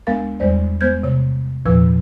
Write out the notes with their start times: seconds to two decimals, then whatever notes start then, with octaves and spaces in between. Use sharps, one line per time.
0.07 D2 G#3 B3 A#4 F5 A6
0.40 E2 G3 G#3 C5 D5
0.81 G#3 B3 C5 F6 G6 G#6
1.03 C3 C#5
1.66 E2 A#2 F3 B4 E6